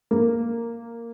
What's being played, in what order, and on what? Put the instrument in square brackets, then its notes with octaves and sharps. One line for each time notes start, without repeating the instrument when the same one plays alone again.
[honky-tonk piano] A#3